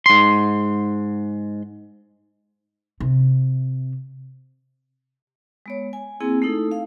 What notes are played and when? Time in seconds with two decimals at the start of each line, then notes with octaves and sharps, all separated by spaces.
0.06 G#2 C6
3.00 C3
5.66 G#3 B3 C#5
5.93 G#5
6.20 A#3 C4 E4 G#4 G#5
6.42 A3 D#4 E4 A4
6.71 F5